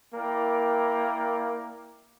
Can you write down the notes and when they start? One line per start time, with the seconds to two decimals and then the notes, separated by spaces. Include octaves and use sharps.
0.14 A#3 E4 A#4 D5 G5